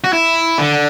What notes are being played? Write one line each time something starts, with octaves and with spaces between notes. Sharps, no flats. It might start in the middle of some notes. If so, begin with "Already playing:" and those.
F#4
E4
D3